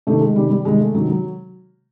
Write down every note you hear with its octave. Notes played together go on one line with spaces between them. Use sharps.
C3 D#3 A3
G#3
C3 D#3 G3
G3
C3 D#3 G#3
A3
C3 D#3 F#3
F#3